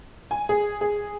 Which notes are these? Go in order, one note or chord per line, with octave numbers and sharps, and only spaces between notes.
G#5
G#4
G#4